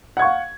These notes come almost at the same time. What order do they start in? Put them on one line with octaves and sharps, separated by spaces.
F#5 G#6 C#6 F5